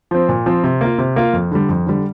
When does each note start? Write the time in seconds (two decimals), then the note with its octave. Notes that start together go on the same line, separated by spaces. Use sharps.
0.11 F3 C4
0.29 A#2
0.46 F3 C4
0.64 C3
0.81 A#3 F4
0.98 C3
1.16 A#3 F4
1.33 F2
1.51 D3 G3
1.69 F2
1.87 D3 G3